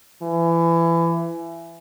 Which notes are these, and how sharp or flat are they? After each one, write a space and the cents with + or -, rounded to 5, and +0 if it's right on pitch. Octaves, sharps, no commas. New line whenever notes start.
E3 +25